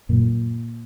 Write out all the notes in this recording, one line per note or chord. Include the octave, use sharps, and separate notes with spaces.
F#2 A#2 A#3